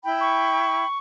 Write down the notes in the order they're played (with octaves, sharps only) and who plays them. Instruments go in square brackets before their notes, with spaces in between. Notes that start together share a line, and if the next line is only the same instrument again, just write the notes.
[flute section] E4 G5 B5
[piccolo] C#6